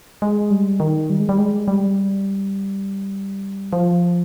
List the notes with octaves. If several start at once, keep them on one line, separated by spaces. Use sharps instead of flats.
G#3
G3
D#3
G3
G#3
G3
G#3
G3
F3